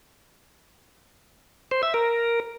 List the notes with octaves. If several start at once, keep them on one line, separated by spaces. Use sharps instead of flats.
C5
E5
A#4